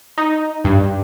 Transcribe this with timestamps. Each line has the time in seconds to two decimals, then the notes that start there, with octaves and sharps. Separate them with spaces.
0.18 D#4
0.64 G2